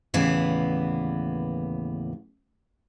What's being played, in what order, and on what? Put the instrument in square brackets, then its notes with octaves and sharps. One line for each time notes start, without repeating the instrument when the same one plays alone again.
[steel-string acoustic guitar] D#2 A2 C#3 E3 B3 D5